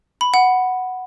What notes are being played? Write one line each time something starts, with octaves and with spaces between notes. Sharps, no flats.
B5
F#5